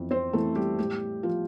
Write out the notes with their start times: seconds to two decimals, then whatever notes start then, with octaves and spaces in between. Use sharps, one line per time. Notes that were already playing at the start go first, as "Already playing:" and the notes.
Already playing: F2 E3
0.11 C4 C5
0.33 E3 A3 A4
0.55 G3 G4
0.79 A2 G3 G4
1.23 F3 F4